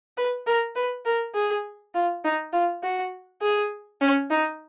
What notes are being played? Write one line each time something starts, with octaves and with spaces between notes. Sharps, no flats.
B4
A#4
B4
A#4
G#4
F4
D#4
F4
F#4
G#4
C#4
D#4